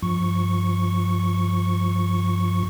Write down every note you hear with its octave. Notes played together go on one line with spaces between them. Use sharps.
G2 F3 C#6